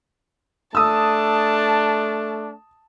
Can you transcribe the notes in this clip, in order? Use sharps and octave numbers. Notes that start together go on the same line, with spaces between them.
A3 D4 A5 D#6 E6